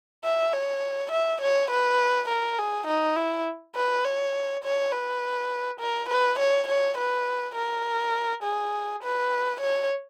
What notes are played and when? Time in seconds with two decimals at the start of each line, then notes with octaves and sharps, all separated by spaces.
0.24 E5
0.53 C#5
1.11 E5
1.41 C#5
1.70 B4
2.29 A#4
2.58 G#4
2.87 D#4
3.16 E4
3.75 B4
4.04 C#5
4.63 C#5
4.92 B4
5.80 A#4
6.09 B4
6.39 C#5
6.67 C#5
6.97 B4
7.55 A#4
8.43 G#4
9.02 B4
9.60 C#5